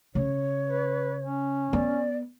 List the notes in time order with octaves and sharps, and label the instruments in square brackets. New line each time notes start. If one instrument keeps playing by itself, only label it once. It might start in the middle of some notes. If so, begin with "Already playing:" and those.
[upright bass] C#3 [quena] C#5
[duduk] B4
C#4
[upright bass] B3 [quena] D5